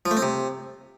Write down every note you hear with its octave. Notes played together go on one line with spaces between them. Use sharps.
F3
A3
C4
C3